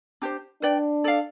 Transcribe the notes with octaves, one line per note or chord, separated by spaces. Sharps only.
D4 G4 C5
D4 B4 D5 G5
A4 D5 F5